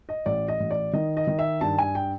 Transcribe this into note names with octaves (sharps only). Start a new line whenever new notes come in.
D#5
A1 D5
D#5
A1
D5
D#3 D#5
D#5
D#3
E5
G2 A5
G#5
G5